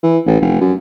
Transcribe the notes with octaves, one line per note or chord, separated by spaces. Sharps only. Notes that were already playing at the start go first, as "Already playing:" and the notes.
E3
A1
F1
F#2